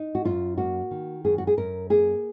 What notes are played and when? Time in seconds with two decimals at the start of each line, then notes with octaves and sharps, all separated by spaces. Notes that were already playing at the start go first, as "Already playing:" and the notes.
Already playing: D#4
0.15 F#4
0.25 F#2 F4
0.58 A#3 F#4
0.91 D#3
1.24 F#2 G#4
1.38 F#4
1.47 G#4
1.57 F#2 A#4
1.90 A#3 G#4